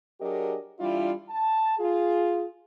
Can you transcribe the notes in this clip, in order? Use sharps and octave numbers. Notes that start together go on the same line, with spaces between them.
F#3 D4 G4 G#4 A#4 D#5
E3 G3 D4 E4 F4
A5
F4 G#4